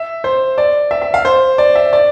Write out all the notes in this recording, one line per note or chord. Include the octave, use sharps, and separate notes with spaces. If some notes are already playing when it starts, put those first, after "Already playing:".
Already playing: E5
C5
D5
E5
E5
F5
C5
D5
E5
D5